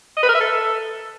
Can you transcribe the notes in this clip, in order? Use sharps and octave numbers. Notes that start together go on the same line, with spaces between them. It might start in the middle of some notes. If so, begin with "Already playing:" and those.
D#5
B4
A#4
E5
A4